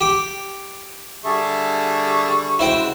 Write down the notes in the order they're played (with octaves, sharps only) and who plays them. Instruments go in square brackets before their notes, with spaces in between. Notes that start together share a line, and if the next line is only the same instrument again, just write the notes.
[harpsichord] G4 D6
[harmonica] D3 G3 C#6 [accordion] G#4 E5 A5
[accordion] C#3 G#3 F#4 [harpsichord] E4 C5 G5